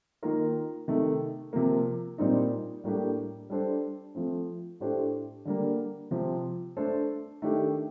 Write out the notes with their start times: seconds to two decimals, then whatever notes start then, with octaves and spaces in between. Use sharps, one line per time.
0.23 D#3 A#3 F4 A#4
0.88 C3 D#3 A3
1.53 C3 F3 A#3
2.18 A#2 G3 C4 D#4
2.84 A2 G3 A#3 D4 G4
3.50 G3 D4 A4 C5
4.15 F3 A3 C4
4.80 A2 A3 D4 G4 C5
5.45 D3 G3 A#3
6.11 C3 F3 C4
6.77 A3 D4 A4 C5
7.42 D#3 A3 D4 G4